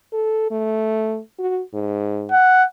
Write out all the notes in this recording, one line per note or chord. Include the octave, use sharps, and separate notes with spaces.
A4
A3
F#4
G#2
F#5